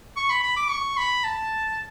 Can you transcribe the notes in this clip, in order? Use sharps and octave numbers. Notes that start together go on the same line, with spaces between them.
C#6
B5
B5
D6
C#6
B5
A5